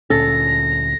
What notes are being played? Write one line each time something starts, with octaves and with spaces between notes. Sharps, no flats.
D2 A#2 C#4 A4 A#6